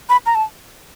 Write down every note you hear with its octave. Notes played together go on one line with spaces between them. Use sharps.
B5
A#5
A5